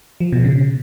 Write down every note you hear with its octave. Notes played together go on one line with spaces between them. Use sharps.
F3
B2
C#3